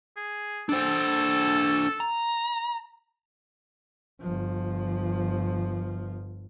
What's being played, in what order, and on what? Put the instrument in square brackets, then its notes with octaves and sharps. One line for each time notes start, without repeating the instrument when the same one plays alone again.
[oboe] G#4
[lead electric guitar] D4 C5 [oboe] A4
[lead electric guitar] A#5
[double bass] G1 F3